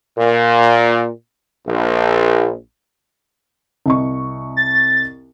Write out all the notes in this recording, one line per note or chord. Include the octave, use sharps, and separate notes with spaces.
A#2
A#1
C2 D#5 C#6
A6